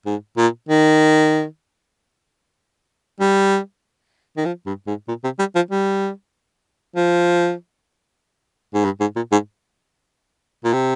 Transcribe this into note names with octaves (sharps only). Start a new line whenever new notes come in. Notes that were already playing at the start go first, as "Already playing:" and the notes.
G#2
A#2
D#3
G3
D#3
F3
G2
G#2
A#2
C3
G3
F3
G3
F3
G#2
G2
G#2
A#2
G#2
A#2
C3